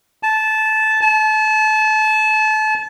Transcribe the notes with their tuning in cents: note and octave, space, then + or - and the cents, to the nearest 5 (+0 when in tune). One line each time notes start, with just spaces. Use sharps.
A5 -15
A5 -30